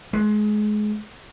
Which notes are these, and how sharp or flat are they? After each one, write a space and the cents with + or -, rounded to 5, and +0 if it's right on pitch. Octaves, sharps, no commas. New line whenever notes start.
G#3 +25